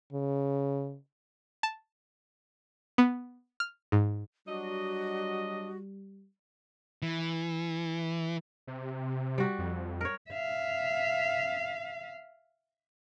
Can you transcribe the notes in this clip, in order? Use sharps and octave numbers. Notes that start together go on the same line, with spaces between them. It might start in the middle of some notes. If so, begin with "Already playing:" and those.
C#3
A5
B3
F6
G#2
F#3 G3 D4 F#4 D#5
E3
C3
G3 F#4
F2
A#4 C#5
E5 F5